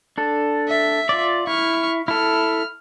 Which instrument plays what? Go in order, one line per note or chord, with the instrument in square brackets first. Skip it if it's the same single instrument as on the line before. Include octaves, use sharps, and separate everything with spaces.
[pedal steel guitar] D4 A4
[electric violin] E5
[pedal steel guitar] F4 D5
[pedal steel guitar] E4 [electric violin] C#6 F6
[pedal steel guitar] E4 A4 [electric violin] F6